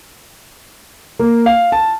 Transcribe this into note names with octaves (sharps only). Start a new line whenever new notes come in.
A#3
F5
A5